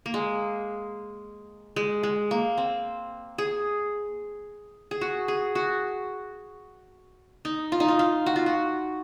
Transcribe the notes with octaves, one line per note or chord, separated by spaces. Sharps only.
A#3
G#3
G#3
G#3
A#3
C4
G#4
G#4
F#4
G#4
F#4
D#4
F4
D#4
F4
F4
F#4
F4
F#4